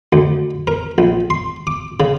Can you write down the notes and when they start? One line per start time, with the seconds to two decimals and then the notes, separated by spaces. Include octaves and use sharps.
0.13 D2
0.67 A#4
0.98 A#1
1.30 C6
1.67 D6
2.00 C#3